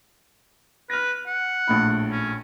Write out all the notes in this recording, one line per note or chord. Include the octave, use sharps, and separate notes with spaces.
B4 F6 A#6
F#5
A#1 A2 B5
C#4